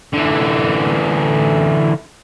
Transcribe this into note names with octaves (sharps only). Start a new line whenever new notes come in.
D3 E3